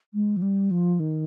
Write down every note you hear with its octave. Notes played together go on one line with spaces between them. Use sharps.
G#3
F3
G3
F3
D#3